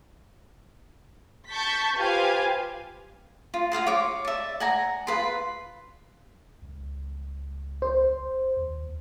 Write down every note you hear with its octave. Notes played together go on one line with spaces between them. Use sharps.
A5 C#6 G6 A6 B6
F4 G4 B4 C5 F5 G#5
F4
F4 F5 F#5 C6
C#5 D6
D5 E5
F#5 G#5 A#5
F4 B4 C6
C#2
C5
D#2